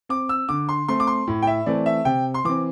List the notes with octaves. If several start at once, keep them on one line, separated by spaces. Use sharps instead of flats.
C4 D6
E6
D3 D6
C6
A3 C4 C6
D6
C6
A2
G5
E5
E3 A3 C4 D5
E5
C3 G5
C6
E3 C4 D6